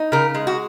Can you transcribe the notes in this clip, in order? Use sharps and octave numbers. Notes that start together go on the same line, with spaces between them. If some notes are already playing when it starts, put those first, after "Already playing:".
Already playing: D#4
C#3 A#4
G#3
F#4